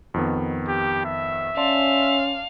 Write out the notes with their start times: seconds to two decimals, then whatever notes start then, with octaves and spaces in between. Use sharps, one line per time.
0.14 F2 D#3 B3
0.68 G4
1.06 E5
1.57 C#4 D5 F5 A5 C6